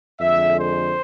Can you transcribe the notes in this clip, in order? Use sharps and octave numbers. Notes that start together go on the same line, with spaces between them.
F2 D3 G#3 E5
C5